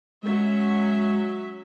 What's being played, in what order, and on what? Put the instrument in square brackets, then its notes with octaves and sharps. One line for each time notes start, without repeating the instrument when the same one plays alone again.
[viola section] F#3 C#4 E5 [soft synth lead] G#3